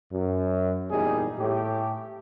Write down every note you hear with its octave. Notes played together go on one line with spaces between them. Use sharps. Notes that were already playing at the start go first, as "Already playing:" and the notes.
F#2
G#1 E2 A#2 G3 D#4 G#4
A2 G4